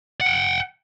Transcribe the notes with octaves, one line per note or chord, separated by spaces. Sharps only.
F#5 G5